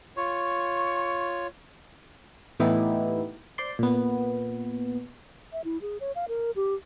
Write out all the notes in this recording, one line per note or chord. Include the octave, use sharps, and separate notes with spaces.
F4 C#5 C#6
A2 E3 B3 D#4 E4 G4
C5 D5 C6
A#2 B3
E5
E4
G#4
C#5
F5
A#4
G4